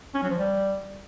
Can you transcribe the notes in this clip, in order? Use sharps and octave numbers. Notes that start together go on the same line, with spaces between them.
C#4
F#3
F3
G3